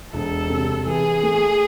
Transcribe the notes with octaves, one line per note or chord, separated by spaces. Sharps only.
E1 A4
C3
E3 G#4
A3